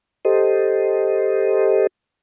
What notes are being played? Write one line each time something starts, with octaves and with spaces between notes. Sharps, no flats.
G4 A4 C5 D#5